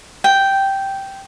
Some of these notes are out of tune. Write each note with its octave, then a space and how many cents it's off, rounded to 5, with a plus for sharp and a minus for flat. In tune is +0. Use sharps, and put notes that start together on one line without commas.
G5 -5